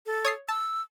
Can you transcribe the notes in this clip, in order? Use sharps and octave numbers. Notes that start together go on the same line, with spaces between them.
A4
C#5 D#6 C7
A5 E6